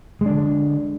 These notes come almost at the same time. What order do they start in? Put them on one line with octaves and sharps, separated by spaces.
G#3 D4 D3